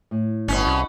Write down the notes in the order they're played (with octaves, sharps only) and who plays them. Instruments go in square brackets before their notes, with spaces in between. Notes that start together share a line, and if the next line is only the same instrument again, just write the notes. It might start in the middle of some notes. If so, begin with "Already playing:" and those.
[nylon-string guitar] A2
[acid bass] G1 [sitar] B2 C#4
[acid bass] C2